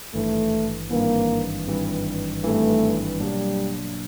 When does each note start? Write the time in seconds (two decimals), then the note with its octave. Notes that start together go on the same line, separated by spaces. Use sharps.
0.14 G#1 G2 E3 A3
0.90 G#1 G2 E3 A#3
1.67 G#1 G2 E3
2.44 G#1 G2 E3 A3
3.20 B2 F#3 G3 A#3 D4